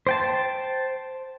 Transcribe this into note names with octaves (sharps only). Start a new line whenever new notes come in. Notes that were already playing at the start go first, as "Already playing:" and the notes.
C5 G5 A5